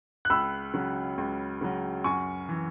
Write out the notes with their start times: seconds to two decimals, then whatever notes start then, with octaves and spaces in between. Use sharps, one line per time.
0.25 F#6
0.30 C#2 B5 E6
0.74 C#3 F#3
1.18 C#2
1.61 C#3 F#3
2.04 F#2 G#5 C#6
2.49 E3